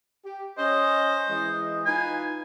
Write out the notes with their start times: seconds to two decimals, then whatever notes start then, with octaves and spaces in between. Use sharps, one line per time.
0.25 G4
0.58 C#4 C5 D#5
1.30 E3 G#3 D#5
1.86 D#4 F4 B4 G#5